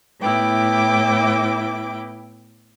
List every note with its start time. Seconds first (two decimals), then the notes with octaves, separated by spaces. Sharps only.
0.21 A2 B3 E4 G5 D6